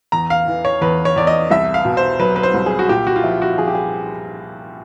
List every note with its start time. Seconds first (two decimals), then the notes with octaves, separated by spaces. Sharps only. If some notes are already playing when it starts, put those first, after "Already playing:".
0.12 E2 A#5
0.30 F5
0.47 E3
0.65 C#5
0.81 E2 B4
1.05 C#5
1.16 E2 D5
1.27 D#5
1.50 C2 E5
1.74 F5
1.85 B2
1.97 C5
2.19 F#3 B4
2.36 B4
2.43 C5
2.54 C2
2.66 G#4
2.79 F#4
2.89 A#2 G4
3.07 F#4
3.16 F4
3.24 F3 E4
3.42 F#4
3.58 F3 G#4
3.67 G4
3.75 G#4